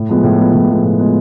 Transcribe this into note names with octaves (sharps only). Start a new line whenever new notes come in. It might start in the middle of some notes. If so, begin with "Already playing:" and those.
Already playing: A2
F3 G#3 B3
A2
F3 G#3 B3
A2
F3 G#3 B3
A2
F3 G#3 B3